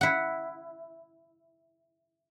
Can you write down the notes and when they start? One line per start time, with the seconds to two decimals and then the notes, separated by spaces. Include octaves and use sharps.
0.01 E4 F#5